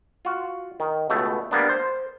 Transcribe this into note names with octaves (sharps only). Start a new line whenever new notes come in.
F4 F#4
D#3
C#2 B2 A3
G3 A#3 B3 D4
C5